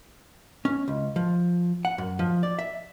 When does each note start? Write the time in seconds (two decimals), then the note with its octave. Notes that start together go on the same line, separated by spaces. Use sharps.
0.65 C#4
0.88 C#2
1.16 F3
1.85 F#5
1.98 F#2
2.19 F3
2.43 D5
2.59 E5